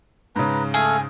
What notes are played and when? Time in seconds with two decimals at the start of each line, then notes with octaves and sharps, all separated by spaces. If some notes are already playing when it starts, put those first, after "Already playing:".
0.36 G#2 C#3 B4 A#5
0.74 A3 G#4 A4 F5